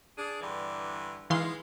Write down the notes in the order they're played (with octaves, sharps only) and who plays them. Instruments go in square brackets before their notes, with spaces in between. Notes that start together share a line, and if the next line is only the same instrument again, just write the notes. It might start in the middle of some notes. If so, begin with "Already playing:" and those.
[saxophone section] D4 G#4
G2 D3 E3
[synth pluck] E3 F5 C6 [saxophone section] G#3 B3 D#4